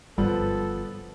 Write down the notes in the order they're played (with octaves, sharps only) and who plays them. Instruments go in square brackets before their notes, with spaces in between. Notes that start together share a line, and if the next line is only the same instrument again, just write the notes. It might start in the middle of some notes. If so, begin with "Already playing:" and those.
[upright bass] G1 [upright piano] F3 B3 [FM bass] G3 [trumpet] A4